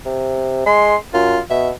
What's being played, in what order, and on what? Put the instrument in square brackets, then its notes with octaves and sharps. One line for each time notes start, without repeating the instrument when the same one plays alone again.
[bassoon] C3
[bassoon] G#3 [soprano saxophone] C6
[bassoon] F#2 [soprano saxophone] F4
[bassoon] B2 [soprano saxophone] E5